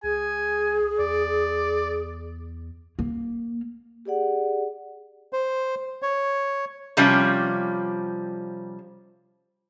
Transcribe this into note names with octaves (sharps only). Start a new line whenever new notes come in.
C#2 G#4 G#5
E2 D5
A#3
G4 G#4 D5 F#5
C5
C#5
C3 F3 G3 C#4